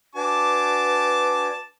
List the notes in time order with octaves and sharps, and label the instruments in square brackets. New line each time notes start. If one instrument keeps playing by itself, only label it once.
[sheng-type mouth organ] D4 F#4 G#5 [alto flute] B4 [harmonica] A5 D6